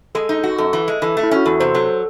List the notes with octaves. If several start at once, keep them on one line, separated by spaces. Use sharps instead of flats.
G#3 A4
D#4
F#4
F#2 A4
E3
G#3
E3 A4
A3
E4
C#4 F#4
E2 A4
C3 C5
F#3 A4